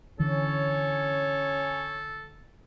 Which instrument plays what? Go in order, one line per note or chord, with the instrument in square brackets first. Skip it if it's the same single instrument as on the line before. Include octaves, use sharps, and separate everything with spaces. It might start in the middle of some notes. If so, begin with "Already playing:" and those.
[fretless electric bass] D3 E3 [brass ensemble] C#4 C#5 [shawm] A4